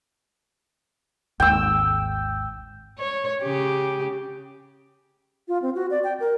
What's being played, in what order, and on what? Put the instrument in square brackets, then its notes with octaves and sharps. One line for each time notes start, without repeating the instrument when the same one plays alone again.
[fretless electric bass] G#1 D#2 G#2 [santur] G5 E6
[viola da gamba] C#5
C#3 G4
[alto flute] F4
C4
F#4
D5
G5
A#4